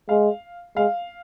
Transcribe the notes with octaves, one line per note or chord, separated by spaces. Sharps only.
G#3 F5
G#3 F5